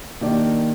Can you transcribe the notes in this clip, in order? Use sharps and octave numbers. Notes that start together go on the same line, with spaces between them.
D#3 A#3 D4 G4 D5